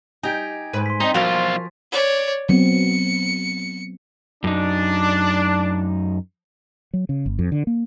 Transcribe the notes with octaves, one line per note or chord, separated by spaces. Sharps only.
D#4 G4 D#5 G#5 G#6 D7
G#2 B4 D#7
C6 B6
C4 D#4 D#5
B1 F3 F4 F#4 A#4 F5 A6
C#5 D5
F#3 B3 C4 C#7
F#2 D4 D#4
F#3
C#3
G1
F2
D3
A#3